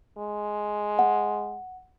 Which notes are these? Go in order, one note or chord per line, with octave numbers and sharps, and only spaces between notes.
G#3
F#5